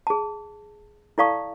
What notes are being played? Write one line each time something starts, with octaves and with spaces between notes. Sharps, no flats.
G#4 A5
E4 A4 D5 F5 A5 C#6